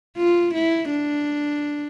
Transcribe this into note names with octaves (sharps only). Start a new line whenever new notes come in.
F4
E4
D4